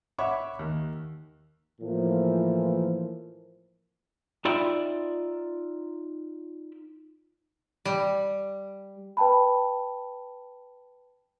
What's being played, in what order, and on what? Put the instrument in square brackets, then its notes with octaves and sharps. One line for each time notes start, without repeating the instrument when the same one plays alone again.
[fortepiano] C#5 E5 F#5 B5 C#6 D6
D#2
[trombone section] A2 E3 F3 A#3
[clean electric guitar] D#4 F4 D5 E5 G5 B5
[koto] G3
[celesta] B4 G5 A5 B5